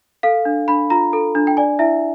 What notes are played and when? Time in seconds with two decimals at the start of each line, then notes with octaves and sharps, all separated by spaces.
0.23 A4 F5
0.45 D4
0.68 D4 B5
0.90 F4 A#5
1.13 A4
1.35 D4
1.47 G5
1.57 D5 G#5
1.79 E4 E5